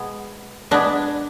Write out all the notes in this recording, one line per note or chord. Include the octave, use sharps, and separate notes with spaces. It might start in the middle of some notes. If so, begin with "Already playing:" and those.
Already playing: B2 G#3 B3
B2 G#3 B3 D4